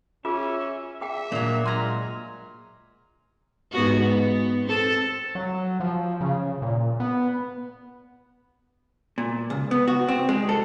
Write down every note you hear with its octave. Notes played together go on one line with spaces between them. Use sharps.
C#4 F4 G#4 E5
G#4 E5 G5
A#2 F#3 A#3 D4 F4
G#3 G#5 A#5 C6 F6
G#2 B3 F#4
B3
C4 A4
F#3
F3
C#3
A#2
B3
A#2
C#2
B3
F#4
C4
G#3
A4